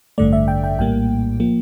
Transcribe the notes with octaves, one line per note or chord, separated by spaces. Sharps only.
A1 G2 D3 A3 D5
E5
G5
G5
A#1 A2 G3 A#3 G5
F3 A#3